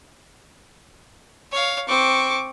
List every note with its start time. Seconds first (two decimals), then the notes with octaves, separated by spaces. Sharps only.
1.51 C#5 F5
1.88 C4 C#6 D6